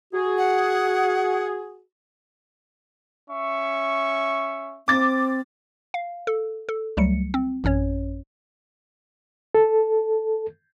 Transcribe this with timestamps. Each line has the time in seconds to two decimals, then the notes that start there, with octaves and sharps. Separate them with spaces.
0.14 F#4 G#4
0.38 F#5
3.30 C#4 E5 C#6
4.88 C4 D6 A6
5.94 F5
6.27 A4
6.69 A4
6.97 C#2 F#3 G3 A3 C#7
7.34 C4
7.64 A1 F#2 C#4 C#5
9.55 A4